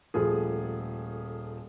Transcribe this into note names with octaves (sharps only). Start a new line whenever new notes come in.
D#1 F3 A3 G#4